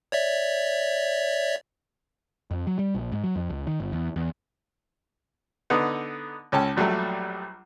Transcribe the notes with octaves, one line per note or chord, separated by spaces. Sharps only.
C#5 D5 E5
F2
F#3
G3
A#1
G#2
F#3
F2
C#2
D#3
G1
E2
E2
D3 B3 D#4
C#2 C#4 A4 G5 A5
A#1 F#3 G3 A3